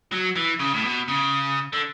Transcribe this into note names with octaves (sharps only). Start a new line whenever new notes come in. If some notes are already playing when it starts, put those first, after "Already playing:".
F#3
E3
C#3
A2
B2
C#3
D3